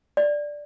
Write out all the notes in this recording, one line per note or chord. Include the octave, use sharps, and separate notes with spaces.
D5